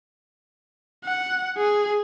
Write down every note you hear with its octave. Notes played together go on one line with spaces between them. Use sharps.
F#5
G#4